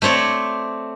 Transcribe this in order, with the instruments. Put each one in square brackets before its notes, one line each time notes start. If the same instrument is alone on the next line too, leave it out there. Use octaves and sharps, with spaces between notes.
[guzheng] A3 C4 C#5 D5